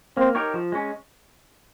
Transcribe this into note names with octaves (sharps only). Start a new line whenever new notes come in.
A#3 C4
D#4 G4 A#4 C#5
F3
G#3 C#4